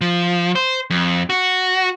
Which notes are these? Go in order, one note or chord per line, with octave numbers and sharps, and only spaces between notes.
F3
C5
F2
F#4